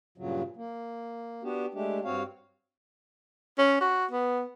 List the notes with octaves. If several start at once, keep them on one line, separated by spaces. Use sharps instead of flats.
G2 A#2 C#3 F#3
A#3
B3 D4 F#4 G4
G#3 A3 D4 G4
G2 C4 F#4 C#5 F5
C#4
F#4
B3